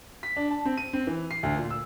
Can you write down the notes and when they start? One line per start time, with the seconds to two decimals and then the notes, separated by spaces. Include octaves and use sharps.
0.23 B6
0.36 D4
0.51 A5
0.65 C4
0.77 D#7
0.93 C4
1.07 E3
1.31 C7
1.43 D2
1.56 A#2
1.70 E6